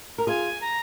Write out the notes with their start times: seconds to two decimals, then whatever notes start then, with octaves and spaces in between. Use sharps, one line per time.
0.18 A#4
0.27 F4 G#4 G#5
0.61 A#5